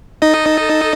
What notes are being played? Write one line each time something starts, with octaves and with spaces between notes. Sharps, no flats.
D#4 A4 D#5 A5